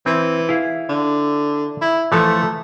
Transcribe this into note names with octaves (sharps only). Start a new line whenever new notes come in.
E3 C4
E4 G#4 F5
D3
E4
E3 F3 A3 A4